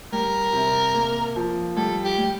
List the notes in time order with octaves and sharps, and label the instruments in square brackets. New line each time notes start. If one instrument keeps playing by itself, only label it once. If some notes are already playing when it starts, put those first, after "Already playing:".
[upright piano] G3 [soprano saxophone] A#4
[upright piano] C3
A#3
F3
[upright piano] G3 [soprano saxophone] A4
[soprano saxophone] G4
[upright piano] G3